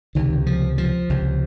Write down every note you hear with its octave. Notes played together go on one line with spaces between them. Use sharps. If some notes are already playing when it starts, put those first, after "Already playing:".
C#2 C3 D#3
F3
F3
C#2 C3